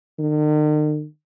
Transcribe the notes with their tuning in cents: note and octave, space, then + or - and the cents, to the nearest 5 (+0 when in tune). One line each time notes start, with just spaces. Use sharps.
D#3 -45